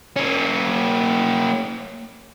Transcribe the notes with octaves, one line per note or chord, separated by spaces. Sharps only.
A#3 C#4